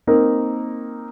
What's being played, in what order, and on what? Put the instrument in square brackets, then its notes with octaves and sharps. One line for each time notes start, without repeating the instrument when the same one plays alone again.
[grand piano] A#3 C4 D#4 A#4